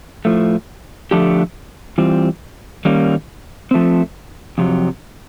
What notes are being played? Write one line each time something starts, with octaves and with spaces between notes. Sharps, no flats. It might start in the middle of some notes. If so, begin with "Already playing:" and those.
A2 F3 A3
D3 F3 A3 D4 G4
E3 G3 C4 F4
D#3 G3 A#3 C#4
F3 A3 C4
F2 C3 F#3